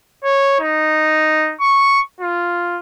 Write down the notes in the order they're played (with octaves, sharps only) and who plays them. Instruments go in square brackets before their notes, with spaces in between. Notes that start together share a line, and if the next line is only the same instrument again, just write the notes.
[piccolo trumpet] C#5
D#4
C#6
F4